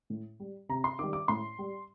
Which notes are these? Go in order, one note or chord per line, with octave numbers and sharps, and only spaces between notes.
A2
G3
C3 A#5
C6
D#3 G3 D6
D6
A2 C6
G3